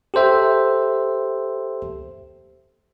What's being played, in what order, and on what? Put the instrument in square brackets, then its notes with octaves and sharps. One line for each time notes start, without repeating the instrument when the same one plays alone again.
[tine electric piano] G4 A4 C5 E5